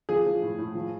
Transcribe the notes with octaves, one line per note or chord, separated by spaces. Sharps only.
F3 G#4
F3
A2
A2
F3